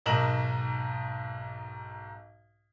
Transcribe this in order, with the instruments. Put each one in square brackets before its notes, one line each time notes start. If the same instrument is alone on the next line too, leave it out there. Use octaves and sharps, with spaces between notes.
[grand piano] B1 G#2 A#4 D#5 E7 F#7